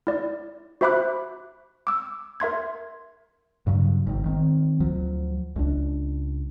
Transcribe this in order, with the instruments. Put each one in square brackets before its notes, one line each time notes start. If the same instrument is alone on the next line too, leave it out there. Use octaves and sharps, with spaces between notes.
[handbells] E4 D5
F#4 C5 E5 B5 D6 F#6
D6 E6
A#4 E5 C6 G#6
[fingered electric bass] G2 C#3 F#3
G#1 D#3
D#3 C4
D2 F3 F#3
C#2 D4